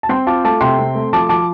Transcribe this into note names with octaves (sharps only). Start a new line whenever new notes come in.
A5
C4 G5 C6
F4 A5 D6
A3 A5 D6
C3 G5 C6
C4
A3
F3 A5 D6
F3 A5 D6